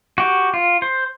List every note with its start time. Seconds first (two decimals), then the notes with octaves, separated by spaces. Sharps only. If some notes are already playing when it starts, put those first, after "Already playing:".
0.18 F#4 G4
0.54 F4
0.82 C5